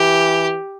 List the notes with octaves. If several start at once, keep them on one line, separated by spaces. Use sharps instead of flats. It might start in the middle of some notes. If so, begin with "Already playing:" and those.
Already playing: E3 G4